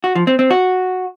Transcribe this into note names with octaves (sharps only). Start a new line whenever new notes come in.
F#4
F3
C4
C4
F#4